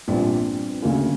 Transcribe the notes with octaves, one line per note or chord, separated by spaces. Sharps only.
A#1 A#2 G3 B3 C4 D4
D2 C#3 F#3 A#3 C#4